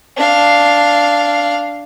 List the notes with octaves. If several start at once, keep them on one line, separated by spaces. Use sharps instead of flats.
D4 F5